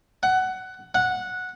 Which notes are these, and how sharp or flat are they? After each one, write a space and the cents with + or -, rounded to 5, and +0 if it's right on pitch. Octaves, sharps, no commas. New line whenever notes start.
F#5 +15
F#5 -10